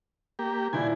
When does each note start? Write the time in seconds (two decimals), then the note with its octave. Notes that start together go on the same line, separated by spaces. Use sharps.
0.39 A#3 G4
0.73 D#1 E4 D5 G#5